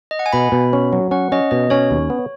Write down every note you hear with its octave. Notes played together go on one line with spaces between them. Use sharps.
D#5
F#5
G#5
B2 B5
B2
C#4
F#3
C#4 F#5
C#4 D#5
B2 D#5
C#4 C#5
D#2
B3